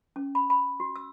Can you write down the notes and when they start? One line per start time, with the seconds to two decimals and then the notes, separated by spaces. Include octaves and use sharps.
0.16 C#4
0.35 B5
0.50 B5
0.80 F#4
0.96 E6